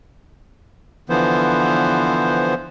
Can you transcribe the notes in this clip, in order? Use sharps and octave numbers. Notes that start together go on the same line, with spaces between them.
D3 E3 F3 B3 C5